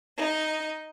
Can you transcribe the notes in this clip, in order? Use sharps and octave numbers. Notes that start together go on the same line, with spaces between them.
D#4